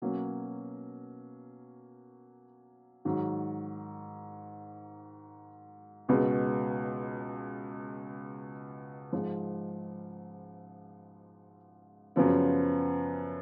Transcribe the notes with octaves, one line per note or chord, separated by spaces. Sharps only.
B2 F#3 A#3 C#4
G#2 D#3 F#3
C#2 B2 G#3 B3
G#2 F3 G#3
F#2 C#3 F3 B3